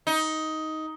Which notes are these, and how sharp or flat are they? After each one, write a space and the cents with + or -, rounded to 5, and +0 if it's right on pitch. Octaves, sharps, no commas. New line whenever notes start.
D#4 +10